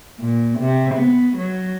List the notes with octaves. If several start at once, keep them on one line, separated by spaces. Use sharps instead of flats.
A#2
C3
B3
F#3